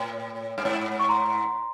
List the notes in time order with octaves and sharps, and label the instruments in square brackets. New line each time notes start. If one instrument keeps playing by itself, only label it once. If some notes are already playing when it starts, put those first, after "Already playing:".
Already playing: [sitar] A2
G2
G#2
[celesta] C#6
A#5 C6